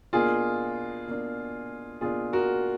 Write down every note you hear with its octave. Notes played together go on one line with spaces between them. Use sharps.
B2 A#3 D4 F4 G#4
B2 A#3 D4
B2 A#3 D4 F4 G#4
F#4 A#4